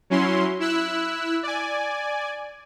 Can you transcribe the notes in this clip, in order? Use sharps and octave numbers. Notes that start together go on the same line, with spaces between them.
F#3 C#4 E4 C6
E4 E6 F#6
D5 G#5